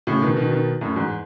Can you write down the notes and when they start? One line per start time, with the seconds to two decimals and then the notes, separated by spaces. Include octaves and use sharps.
0.07 A2 C#3
0.22 B2 D#3
0.37 B2 D#3
0.52 B2 D#3
0.81 F#2 A2
0.96 E2 G#2